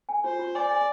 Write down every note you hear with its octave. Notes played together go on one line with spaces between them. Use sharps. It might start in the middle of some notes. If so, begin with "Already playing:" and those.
G#5
F4 C5
F4
D5 G#5
G#5